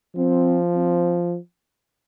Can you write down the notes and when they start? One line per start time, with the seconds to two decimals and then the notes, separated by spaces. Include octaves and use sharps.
0.16 F3 C4
0.75 C4